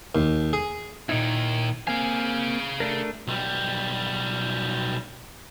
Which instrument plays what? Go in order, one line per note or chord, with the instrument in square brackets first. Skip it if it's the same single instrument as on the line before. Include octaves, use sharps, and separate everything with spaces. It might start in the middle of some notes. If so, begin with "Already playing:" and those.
[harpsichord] D#2
G#4
[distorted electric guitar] D#2 D#3 [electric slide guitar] A#2 D#4 E4
[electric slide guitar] A#3 C4 G#5 [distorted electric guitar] G#4 F5
[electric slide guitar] A3 D4 A#4
[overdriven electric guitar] B1 G3